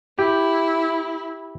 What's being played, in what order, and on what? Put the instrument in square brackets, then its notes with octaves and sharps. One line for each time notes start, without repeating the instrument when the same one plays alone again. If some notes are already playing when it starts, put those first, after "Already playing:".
[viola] E4 [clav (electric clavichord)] G4